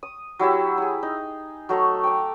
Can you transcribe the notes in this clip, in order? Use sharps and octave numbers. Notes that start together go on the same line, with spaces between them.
D#6
F#3 E4 G4 E5
E4 G#4
D#4
F#3 A3 A#5 C#6
G5 D6